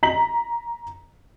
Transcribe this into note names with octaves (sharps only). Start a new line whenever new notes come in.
A#5 B6 F#7